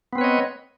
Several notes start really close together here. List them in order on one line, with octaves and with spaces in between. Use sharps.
B3 C4 B4 C#5 D#5